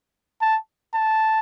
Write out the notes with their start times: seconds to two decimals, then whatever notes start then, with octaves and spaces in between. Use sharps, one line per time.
0.42 A5
0.94 A5